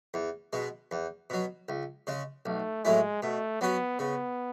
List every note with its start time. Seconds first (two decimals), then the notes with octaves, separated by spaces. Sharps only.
0.14 E2
0.53 B2 G#3
0.91 E2
1.30 B2 F#3
1.69 C#2
2.07 C#3 G#3
2.46 B1 A3
2.84 A2 F#3 G#3 A3 E4
3.23 B2 A3
3.61 F#3 B3 C#4 F#4
3.99 C#3 B3